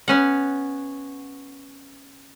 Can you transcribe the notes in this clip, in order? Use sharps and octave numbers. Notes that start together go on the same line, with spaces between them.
B3 C#4 F#5